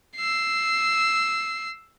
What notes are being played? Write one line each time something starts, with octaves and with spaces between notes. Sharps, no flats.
E6 C7